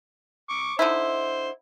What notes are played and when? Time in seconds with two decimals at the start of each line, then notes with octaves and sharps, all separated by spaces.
0.50 C#6 D6
0.79 D3 D#4 E4 C5